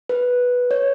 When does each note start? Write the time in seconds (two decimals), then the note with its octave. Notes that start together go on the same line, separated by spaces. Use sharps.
0.09 B4
0.71 C#5